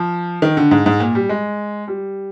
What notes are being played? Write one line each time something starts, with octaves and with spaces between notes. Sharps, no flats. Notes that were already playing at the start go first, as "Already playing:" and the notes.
Already playing: F3
D#3
D3
G#2
G#2
A#2
G3
G#3
G3